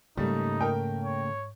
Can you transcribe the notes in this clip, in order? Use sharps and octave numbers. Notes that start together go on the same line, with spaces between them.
G#2 C#3 G3 A3 A#3 D#4
A#4 G5
C#5